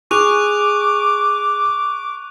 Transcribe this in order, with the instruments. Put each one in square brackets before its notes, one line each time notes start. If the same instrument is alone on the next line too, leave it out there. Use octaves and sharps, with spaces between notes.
[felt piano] G#4 [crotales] C#6 F#6 F7 [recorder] D6